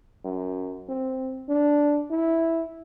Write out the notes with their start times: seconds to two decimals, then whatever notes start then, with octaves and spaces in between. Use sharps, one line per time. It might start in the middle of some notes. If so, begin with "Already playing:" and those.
0.25 F#2
0.89 C4
1.49 D4
2.10 E4